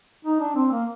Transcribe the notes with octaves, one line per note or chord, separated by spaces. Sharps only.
D#4
D4
C4
A#3